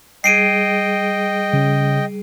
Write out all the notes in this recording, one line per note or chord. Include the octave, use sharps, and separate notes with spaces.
G3 G#4 D#5 G5 C7 D7 D#7
C#3